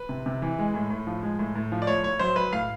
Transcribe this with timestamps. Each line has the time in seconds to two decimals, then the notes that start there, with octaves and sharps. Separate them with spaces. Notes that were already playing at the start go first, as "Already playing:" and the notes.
Already playing: B4
0.09 C3
0.26 C3
0.42 E3
0.59 G#3
0.74 A2
0.90 A2
1.07 F3
1.23 G#3
1.39 A2
1.56 A2
1.72 F3
1.82 D5
1.87 A2 C#5
2.03 A2 C#5
2.19 F#3 C5
2.36 F#3 B4
2.52 A2 F5